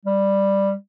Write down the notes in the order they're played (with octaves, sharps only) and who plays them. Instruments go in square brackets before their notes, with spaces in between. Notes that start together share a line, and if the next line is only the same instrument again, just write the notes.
[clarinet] G3